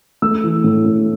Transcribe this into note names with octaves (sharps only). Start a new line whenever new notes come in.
A3 E6
E3
A2
A2